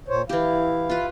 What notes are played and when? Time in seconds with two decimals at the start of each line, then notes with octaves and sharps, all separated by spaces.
0.08 A#2 C5 C#5
0.29 E3 E4 G4 F5
0.90 F4 B4